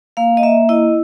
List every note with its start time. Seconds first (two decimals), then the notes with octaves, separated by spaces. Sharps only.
0.17 A#3 F5
0.37 D#5
0.43 A#3 E5
0.69 E4 D#5